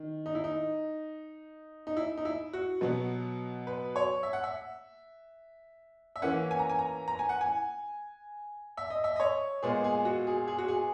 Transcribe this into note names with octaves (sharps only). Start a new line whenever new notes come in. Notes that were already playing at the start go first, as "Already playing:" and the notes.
Already playing: D#3
D#4
E4
D#4
D#4
E4
D#4
E4
F#4
B2 F#3 B3
B4
C#5
E5
F#5
E5
E5
E3 A#3 C#4 F#5
G#5
A#5
G#5
A#5
A#5
G#5
F#5
G#5
E5
D#5
E5
D#5
C#5
A#2 G#3 B3 G#4
G#4
F#4
G#4
G#4
F#4
G#4